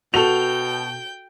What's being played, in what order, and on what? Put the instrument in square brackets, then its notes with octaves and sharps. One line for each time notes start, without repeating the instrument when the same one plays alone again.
[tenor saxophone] B2 [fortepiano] F#4 A4 [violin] G5 G6 [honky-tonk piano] F7